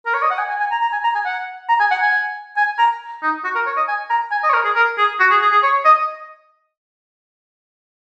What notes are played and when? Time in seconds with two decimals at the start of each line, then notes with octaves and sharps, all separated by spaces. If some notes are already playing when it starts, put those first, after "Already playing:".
0.06 A#4
0.14 C#5
0.22 D#5
0.30 F#5
0.38 G#5
0.49 G#5
0.60 G#5
0.71 A#5
0.81 A#5
0.93 G#5
1.04 A#5
1.15 G#5
1.25 F#5
1.69 A#5
1.80 G#5
1.91 F#5
2.02 G#5
2.57 G#5
2.78 A#5
3.23 D#4
3.44 F#4
3.55 A#4
3.66 C#5
3.77 D#5
3.88 G#5
4.10 A#5
4.31 G#5
4.43 D#5
4.50 C#5
4.53 A#4
4.65 G#4
4.75 A#4
4.98 G#4
5.20 F#4
5.31 G#4
5.42 G#4
5.52 G#4
5.63 C#5
5.85 D#5